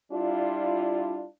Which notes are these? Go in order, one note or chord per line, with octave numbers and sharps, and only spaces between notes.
G3 D4 E4 F4